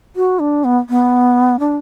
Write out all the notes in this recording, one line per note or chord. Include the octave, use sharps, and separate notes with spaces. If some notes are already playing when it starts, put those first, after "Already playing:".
F#4
D4
B3
B3
D4